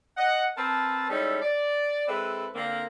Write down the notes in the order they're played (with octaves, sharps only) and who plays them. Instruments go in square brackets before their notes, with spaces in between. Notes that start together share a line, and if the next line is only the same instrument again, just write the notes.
[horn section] D#5 F#5
C4 A#4 B4 A5
G3 G#3 C#4 D#4 E4 A4
D5
G#3 C4 E4 A4 B4
D3 A#3 C4